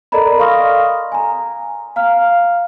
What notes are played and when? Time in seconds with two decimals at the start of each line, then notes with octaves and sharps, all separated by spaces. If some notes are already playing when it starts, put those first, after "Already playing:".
0.12 A4 A#4 D5 D#5 A#5 B5
0.39 F5 C6 C#6 D#6 F6 A#6
1.12 G#5 A#5
1.96 F5 A#5 F6